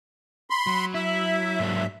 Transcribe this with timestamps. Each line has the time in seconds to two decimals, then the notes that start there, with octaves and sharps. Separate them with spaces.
0.50 B5 C6
0.67 F#3
0.94 E4 E5
1.59 G#2 A#3 D4